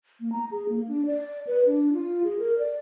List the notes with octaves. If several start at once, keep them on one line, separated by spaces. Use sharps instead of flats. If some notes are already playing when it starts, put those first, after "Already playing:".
A#3
A#5
G#4
A#3
D4
D5
B4
D4
F4
G#4
A#4
D5